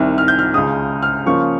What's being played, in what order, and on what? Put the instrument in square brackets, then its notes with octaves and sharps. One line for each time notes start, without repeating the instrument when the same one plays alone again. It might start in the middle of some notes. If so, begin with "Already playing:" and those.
Already playing: [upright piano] C2 C3 D#3
F6
G6
F6
C#2 C#3 G#3 D#6
F6
C#3 F3 A#3 C#4 F4 C#6